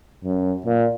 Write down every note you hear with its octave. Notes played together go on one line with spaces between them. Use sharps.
F#2
A#2